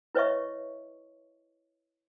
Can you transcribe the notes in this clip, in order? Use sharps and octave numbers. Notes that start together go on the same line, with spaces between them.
E4 B4 C#5 D#5 E5 C#6